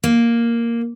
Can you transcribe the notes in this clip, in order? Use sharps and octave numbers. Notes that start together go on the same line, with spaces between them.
A#3